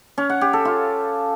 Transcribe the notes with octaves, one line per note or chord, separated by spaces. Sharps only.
C#4
F#5
G4
A4
F4